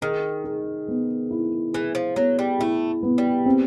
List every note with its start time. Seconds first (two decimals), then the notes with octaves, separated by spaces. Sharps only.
0.02 D#3 G#4
0.44 G#4
0.88 B3
1.31 E4
1.73 E3 G#4
1.95 F3
2.16 F#3 B3
2.39 G3
2.59 A3 E4
3.03 B3
3.18 G3
3.46 C4